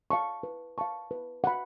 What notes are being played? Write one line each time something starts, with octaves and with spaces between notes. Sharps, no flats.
F5 A5 C#6
B4
F5 A5 C#6
B4
F#5 B5